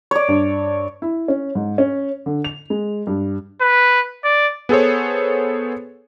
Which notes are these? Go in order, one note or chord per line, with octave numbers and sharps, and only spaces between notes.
C#5 D5
G2
E4
C#4
G#2
C#4
D3
F7
G#3
G2
B4
D5
B3 G#4 A4 C5 C#5